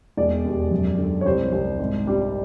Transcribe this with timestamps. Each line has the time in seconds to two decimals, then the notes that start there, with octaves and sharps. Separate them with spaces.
0.17 E1 D5
0.45 D#2
0.71 F#2
0.98 D3
1.21 C#5
1.26 C2 C5
1.52 C2
1.79 G#1
2.07 G3